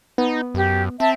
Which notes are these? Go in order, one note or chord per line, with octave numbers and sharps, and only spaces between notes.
B3 D#4
F#2 G4
C4 E5 A5